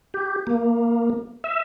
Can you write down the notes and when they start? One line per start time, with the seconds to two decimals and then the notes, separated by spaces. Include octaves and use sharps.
0.14 G4
0.47 A#3
1.44 E5